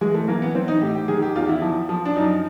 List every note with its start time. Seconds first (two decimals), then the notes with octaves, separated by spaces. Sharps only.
0.01 E3 G#3
0.14 A3
0.28 E3 A#3
0.42 B3
0.55 E3 C4
0.68 D#4
0.81 A2 G4
0.95 G4
1.08 D#3 G#4
1.22 G4
1.36 E2 F4
1.49 E4
1.62 F3
1.89 F3
2.05 D4
2.16 F#2 D#4